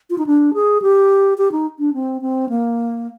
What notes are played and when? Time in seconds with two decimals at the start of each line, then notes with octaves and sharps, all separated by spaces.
0.10 F4
0.18 D#4
0.26 D4
0.54 G#4
0.82 G4
1.38 G4
1.52 D#4
1.79 D4
1.94 C4
2.22 C4
2.49 A#3